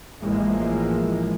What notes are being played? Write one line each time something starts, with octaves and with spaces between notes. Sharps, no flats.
A1 E3 F3 G#3 A#3